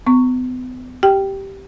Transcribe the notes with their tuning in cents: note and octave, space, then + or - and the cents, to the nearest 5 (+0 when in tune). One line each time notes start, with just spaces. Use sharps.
B3 +40 C#6 +5
G4 -10 G5 -5